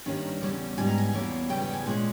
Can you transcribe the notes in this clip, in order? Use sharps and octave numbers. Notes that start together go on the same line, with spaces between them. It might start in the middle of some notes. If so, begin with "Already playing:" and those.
G2 D#3 G3 A#3 C#4
E2 C#3 G3 C#4
G#2 G3 B3 G#5
A#5
G#5
E2 B2 A#3 C#4
E2 C#3 G3 B3 G5
G5
G#5
A#2 G#3 C#4